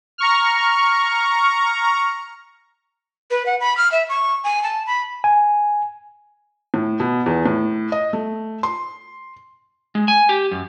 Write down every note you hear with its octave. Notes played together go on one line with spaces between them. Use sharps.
A#5 C#6 F6
B4
F#5
B5
F6
E5
C#6
G#5
A5
B5
G#5
A2
B2
E2
A2
D#5
A3
C6
G#3
G#5
G4
F#2